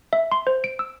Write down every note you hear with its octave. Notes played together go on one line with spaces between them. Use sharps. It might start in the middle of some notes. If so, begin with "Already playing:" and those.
E5
C6
C5
D7
E6